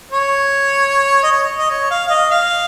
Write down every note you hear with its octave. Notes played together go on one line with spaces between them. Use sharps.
C#5
D#5
C#5
D#5
C#5
F5
F5
D#5
F5